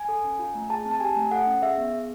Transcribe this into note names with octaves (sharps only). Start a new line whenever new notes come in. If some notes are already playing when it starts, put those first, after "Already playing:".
Already playing: G#5
A4
C#4
F4
A3
G#4 A5
C4
A5
G4 G#5
A3
A4 F#5
C#4
G#4 E5
B3
G#4